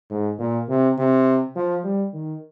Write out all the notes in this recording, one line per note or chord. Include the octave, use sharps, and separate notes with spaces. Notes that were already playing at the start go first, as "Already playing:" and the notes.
G#2
A#2
C3
C3
F3
G3
D#3